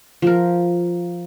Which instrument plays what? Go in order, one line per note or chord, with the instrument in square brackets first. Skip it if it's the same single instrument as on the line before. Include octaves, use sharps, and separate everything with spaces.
[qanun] F3 A#4